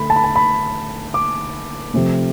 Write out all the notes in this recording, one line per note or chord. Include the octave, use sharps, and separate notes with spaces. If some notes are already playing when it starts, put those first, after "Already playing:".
Already playing: D3 A3 B5
A5
B5
A5
B5
D6
C3 F3 A3